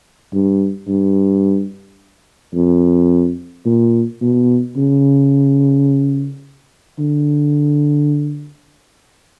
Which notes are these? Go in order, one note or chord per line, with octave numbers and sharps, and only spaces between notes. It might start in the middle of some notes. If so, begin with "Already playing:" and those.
G2
G2
F2
A#2
B2
C#3
D3